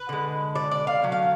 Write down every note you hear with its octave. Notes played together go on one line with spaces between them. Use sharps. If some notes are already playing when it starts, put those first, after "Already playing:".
Already playing: B4
D3 G#3
D5
D5
F5
D3 F#3 A3
F5